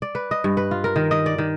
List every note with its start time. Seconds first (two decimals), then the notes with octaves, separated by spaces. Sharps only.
0.02 D5
0.15 B4
0.31 D#5
0.44 G2
0.57 B4
0.71 F4
0.84 A#4
0.96 D#3
1.11 D#5
1.26 D5
1.38 D#3